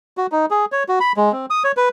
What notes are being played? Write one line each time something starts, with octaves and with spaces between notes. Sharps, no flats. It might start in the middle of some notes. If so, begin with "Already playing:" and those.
F#4
D#4
G#4
C#5
F#4
B5
G#3
C4
D#6
C#5
B4